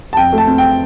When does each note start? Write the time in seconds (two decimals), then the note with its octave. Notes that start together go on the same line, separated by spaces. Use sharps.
0.13 A5
0.17 F2 G5
0.33 A3
0.38 A5
0.47 C4
0.58 G5